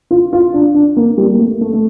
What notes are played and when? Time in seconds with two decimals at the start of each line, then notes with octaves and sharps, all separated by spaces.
0.11 F4
0.33 F4
0.54 D4
0.74 D4
0.97 A#3
1.18 G3
1.34 A#3
1.39 A3
1.61 A3
1.73 A3